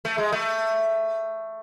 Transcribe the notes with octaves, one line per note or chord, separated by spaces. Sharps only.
A3
G#3
A3